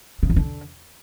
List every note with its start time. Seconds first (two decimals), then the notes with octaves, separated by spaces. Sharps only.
0.23 C#3
0.30 E2
0.36 D3